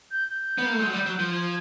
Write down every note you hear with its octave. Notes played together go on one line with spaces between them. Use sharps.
G6
G6
B3
A#3
A3
G#3
F#3
G3
F#3
F3
G#6